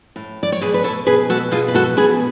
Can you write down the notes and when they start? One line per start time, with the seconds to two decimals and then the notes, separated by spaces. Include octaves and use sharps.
0.16 A2
0.43 D5
0.52 C#5
0.61 B2 G#4 B4
0.74 B4
0.84 A4 C#5
1.07 B2 G#4 B4
1.30 F#4 A4
1.51 B2 F4 G#4
1.68 B4
1.75 F#4 A4
1.97 B2 G#4 B4